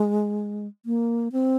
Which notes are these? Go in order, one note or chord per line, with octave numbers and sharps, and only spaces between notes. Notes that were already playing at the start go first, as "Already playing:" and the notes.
Already playing: G#3
A#3
C4